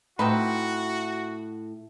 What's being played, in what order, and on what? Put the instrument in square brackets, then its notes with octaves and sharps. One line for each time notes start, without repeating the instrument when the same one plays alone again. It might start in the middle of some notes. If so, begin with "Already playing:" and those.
[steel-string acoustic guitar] A2 [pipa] C4 D#4 B4 [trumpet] F#4